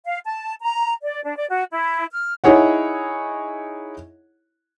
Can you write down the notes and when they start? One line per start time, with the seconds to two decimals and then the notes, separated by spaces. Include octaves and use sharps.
0.06 F5
0.25 A5
0.61 A#5
1.03 D5
1.23 D4
1.37 D5
1.50 F#4
1.71 E4
2.12 F6
2.44 D#4 E4 G#4 C#5 F#5